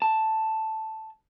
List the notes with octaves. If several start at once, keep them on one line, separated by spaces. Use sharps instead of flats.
A5